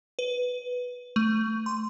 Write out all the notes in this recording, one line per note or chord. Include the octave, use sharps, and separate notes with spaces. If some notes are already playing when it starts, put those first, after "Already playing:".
B4
A3
C6